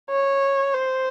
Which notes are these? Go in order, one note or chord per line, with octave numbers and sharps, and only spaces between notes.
C#5
C5